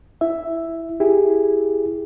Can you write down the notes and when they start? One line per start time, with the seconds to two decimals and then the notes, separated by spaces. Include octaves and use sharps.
0.21 E4 E5
1.00 E4 G4 G#4